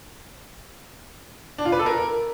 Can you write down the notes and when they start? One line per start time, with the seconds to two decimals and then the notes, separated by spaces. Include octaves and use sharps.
1.58 D4
1.65 F4
1.72 B4
1.79 A4
1.86 A#4